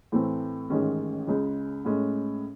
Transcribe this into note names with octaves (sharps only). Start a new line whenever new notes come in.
A2 E3 A3 C4
A1 G#2 D#3 G#3 C#4
C#2 C#3 G#3
A2 G#3 C#4